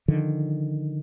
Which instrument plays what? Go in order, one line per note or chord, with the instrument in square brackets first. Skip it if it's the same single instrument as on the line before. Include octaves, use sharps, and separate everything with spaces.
[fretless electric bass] D3 D#3 F3